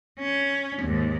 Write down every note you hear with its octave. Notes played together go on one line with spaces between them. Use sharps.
C#4
D#2 G#2